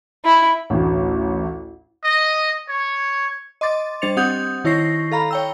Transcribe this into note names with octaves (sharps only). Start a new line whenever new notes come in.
E4
A1 D2
D#5
C#5
D#5 C6 D6 A6
G3 D4 C5 A6 C#7 F7
C4 G4 F#5 D#6 G6 G#6
D#3 E4 C#5 C#6 A#6 C7
A4 F5 A#5 B5
C#5 G5 E6